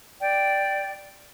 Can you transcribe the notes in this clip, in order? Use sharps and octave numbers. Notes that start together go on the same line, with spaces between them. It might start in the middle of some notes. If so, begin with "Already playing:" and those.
D5 G5